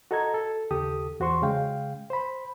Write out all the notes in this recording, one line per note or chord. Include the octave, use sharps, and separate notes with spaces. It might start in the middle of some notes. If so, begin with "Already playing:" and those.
F#4 A4 D#5 A#5 G#6
A4
D#2 C#3 G4 A4 D#6
E2 F#4 C5 C6 C#6
C#3 G#3 F5 G5
C5 B5